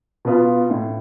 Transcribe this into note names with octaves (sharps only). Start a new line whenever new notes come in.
B2 B3 F4
A2